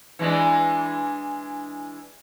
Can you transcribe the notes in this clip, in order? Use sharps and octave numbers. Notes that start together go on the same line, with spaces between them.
E3 G#3 D4